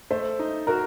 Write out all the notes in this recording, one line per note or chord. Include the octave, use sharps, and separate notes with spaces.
A3 C5
D#4
F#4 A#4